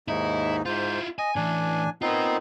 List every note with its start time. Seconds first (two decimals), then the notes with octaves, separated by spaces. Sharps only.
0.08 D#2 G#2 D#4 E4
0.65 G#2 E4 F4 C5
1.19 D#5 G#5
1.36 A2 E3 D4 G#5
2.02 B3 C4 D#4 F4 A#4